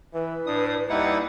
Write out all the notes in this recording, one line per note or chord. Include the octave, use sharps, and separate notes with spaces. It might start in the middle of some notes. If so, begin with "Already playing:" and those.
E3 B4
A2 D4 D#6
D#2 G3 D#4 E4 B4 F#5